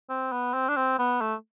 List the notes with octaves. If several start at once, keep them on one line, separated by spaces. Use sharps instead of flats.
C4
B3
C4
D4
C4
B3
A3